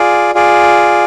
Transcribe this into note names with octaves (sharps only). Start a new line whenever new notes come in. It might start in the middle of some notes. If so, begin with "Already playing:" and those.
Already playing: F4 G#4 D5
F4 G#4 D5